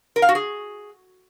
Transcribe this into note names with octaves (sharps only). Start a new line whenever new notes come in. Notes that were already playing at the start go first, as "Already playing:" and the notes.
A#4
F5
F#4
G#4